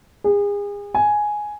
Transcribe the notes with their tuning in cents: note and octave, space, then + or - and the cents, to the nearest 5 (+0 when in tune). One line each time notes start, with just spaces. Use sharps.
G#4 -35
G#5 +5